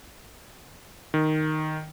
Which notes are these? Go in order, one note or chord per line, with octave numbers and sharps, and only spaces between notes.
D#3